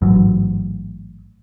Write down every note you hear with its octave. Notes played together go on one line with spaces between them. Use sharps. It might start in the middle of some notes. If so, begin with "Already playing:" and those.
A1 G#2 F#3